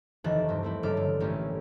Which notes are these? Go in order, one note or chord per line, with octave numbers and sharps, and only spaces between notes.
F1 D#2 D#3 E3 A5 F#6
G2 C4
A3 C4 E4
F#1 G2 C#3 A4 D6 F6
D3
A1 A3 A#3 C#4 G4